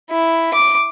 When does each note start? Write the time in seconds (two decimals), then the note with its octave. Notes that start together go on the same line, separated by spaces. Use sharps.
0.10 E4
0.53 D6